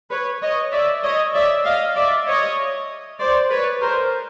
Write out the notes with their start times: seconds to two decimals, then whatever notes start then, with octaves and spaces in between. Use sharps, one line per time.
0.10 B4 C#5
0.42 C#5 D#5
0.72 D5 E5
1.03 C#5 D#5
1.34 D5 E5
1.65 D#5 F5
1.96 D5 E5
2.27 C#5 D#5
3.19 C5 D5
3.50 B4 C#5
3.82 A#4 C5